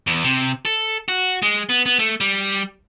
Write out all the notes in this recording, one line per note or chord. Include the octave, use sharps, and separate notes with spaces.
E2
C3
A4
F#4
G#3
B3
B3
A3
G3